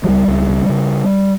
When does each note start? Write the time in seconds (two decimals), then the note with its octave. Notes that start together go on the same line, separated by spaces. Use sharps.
0.04 F#3
0.08 C#2 G3
0.28 C#2
0.49 C#3
0.69 C#3